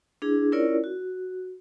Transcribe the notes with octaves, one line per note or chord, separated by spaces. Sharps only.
D4 E4 G#4
C#4 E4 F4 A#4 C#5 D5
F#4